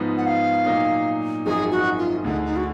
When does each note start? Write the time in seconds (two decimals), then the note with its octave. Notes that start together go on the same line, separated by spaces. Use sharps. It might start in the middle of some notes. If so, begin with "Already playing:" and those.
Already playing: G#2 F3 B3 D#4
0.18 F#5
0.26 F5
0.66 A#2 F#3 A#3 D#4
1.46 G#1 F#2 F3 G#3 D#4 G#4
1.71 F#4
1.98 F4
2.24 D2 D3 G#3 D#4
2.45 D#4
2.56 F#4